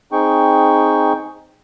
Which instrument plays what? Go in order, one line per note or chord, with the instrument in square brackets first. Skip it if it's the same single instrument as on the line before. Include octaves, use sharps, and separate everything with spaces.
[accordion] C4 D#4 G#4 G5 C#6